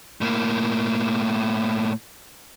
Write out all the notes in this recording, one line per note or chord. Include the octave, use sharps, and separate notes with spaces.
A2 A#3